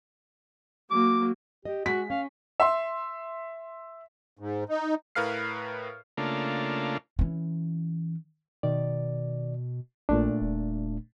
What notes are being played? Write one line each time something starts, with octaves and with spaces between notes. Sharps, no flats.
F#3 A#3 D6
G4 D#5
G#3 F#4 B6
C#4 F5
E5 C6
G#2
D#4
A2 A#4 B4 F5 F6 C7
C#3 A3 A#3 D4 F4
E3 C#4
B2 D#3 D5
A#1 A#2 A3 D4
D#1